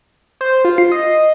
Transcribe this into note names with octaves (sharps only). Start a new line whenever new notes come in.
C5
F4
C7
D#5